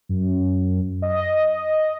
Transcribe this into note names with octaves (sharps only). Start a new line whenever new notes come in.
F#2
D#5